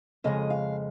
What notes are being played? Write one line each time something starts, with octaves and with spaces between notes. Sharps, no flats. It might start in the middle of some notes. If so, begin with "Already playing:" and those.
F2 C#3 G#3 D#5
F5